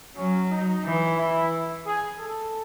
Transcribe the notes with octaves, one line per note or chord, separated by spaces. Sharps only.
F#3 C#4
D#4
E3
E4
G#4
A4